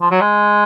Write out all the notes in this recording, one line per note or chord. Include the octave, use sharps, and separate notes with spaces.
F3
F#3
G#3